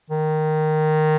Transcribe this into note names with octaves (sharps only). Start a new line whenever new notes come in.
D#3